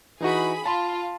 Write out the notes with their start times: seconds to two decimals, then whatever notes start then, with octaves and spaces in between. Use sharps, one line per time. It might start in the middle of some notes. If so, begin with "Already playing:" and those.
0.21 E3 D#4 F#4 G#4 B5
0.66 F4 A5 B5 C6